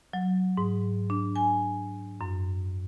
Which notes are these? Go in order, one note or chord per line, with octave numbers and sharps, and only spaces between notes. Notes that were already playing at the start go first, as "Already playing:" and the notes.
F#3
G#2
D4
G#5
F#2